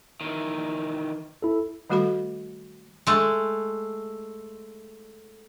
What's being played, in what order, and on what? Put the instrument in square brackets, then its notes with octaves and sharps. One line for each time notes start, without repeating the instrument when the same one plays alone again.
[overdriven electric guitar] D#3 E3
[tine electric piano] E4 A4
[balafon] D#3 G3 A3 F#4 A4 B5
[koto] G#3 A3